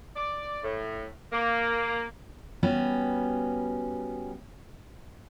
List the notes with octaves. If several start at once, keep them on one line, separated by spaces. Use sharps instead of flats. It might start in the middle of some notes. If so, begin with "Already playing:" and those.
D5
A2
A#3
G3 B3 C#4 F#4